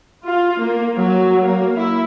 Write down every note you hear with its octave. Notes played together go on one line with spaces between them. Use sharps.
F4
A#3
F#3
A#3
E4